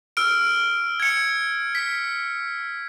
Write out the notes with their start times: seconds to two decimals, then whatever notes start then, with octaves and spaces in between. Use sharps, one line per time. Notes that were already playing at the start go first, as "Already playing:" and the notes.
0.17 E6 F6 D7
1.00 G#6 C#7
1.75 B6